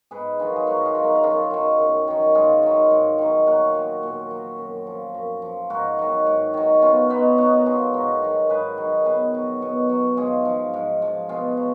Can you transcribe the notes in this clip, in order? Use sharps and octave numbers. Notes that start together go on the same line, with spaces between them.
G#2 G#4 B4
D#3 F#3 F4 G#4
G#4
G#2 F#4 A#4
F4 G#4
D#3 F#3
F#4 A#4
A#4
F#2 F4 G#4
D#3 F#3
F#2
D#3 F#3
G#2 F4 G#4
D#3 F#3
G#2
D#3 F#3
A#2 F#4 A#4
F#3
A#2
F#3
F#2
F3
F#2
F3
G#2 F#4 A#4
D#3 F#3
G#2
D#3 F#3
B2 C#4 F4
F#3 B3 D#4
B2 D#4 F#4
A#4
F#3 F4 G#4
G#2 F#4 A#4
D#3 F#3
G#2 G#4 B4
D#3 F#3
B2 G#4 B4
F#3
B2
F#3
G#2 F4 G#4
F3
G#2
F3
B2 F4 G#4
F#3